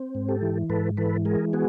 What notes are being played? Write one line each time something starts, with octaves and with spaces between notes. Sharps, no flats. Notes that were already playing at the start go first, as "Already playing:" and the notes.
Already playing: C4
G#2
G4 A4
E3
G#2 A4 B4
E3 A4 B4
G#3 G#4 A#4
B3 F#4 G#4